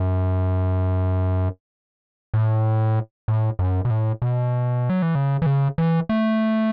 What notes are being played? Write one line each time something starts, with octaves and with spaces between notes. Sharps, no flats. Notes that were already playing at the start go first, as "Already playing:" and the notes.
Already playing: F#2
A2
A2
F#2
B2
A2
B2
F#3
E3
C#3
E3
C#3
E3
A3